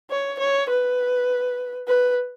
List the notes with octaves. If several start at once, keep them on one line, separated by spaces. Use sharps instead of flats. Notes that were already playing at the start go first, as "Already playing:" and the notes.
C#5
C#5
B4
B4